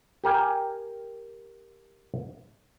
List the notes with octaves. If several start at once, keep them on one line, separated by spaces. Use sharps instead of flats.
G4 A#4 G5 G#5